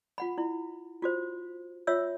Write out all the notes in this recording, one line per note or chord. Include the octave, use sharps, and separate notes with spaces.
F4 F#5 B5
E4
F4 F#4 C5
F4 C#5 E5 E6